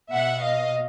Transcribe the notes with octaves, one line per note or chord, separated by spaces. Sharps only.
B2 E5 F#5
D#5 F5